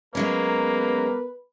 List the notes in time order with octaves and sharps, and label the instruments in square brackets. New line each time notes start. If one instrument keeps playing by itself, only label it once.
[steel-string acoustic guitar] F#3 G#3 C#4 [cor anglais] A#3 [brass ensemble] B3 A#4 [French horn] B4